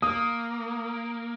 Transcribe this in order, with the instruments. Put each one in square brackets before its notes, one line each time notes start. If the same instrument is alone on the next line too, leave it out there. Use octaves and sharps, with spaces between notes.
[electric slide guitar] A#3 [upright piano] D#6